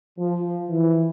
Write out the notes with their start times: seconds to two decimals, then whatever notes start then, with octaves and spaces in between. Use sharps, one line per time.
0.19 F3
0.69 E3